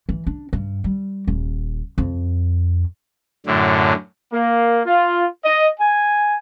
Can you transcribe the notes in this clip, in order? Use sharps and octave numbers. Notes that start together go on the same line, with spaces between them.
E3
D4
G2
G3
D#1
F2
F#2 A2 D3
A#3
F4
D#5
G#5